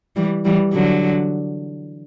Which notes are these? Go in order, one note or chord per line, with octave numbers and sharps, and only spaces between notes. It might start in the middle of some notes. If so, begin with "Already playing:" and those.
E3 G3
E3 G3
D3 F#3